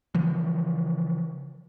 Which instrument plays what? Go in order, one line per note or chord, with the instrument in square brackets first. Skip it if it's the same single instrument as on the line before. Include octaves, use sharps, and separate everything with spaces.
[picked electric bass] C#3 E3 F3